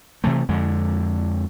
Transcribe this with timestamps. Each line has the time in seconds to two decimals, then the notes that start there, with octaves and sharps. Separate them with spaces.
0.24 C3 E3 A3
0.49 F2 D3 G#3